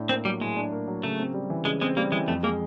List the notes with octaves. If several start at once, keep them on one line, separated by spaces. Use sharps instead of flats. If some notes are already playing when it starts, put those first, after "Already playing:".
Already playing: A2 D4
A#3 C4
F#3 G3
A2 G#3
D4
A#3
F#3
C#3 A3
C4
G3
E3
C#3 G#3
G#3 C4
G3 A#3
E3 G#3
F2 A3
G#3 A#3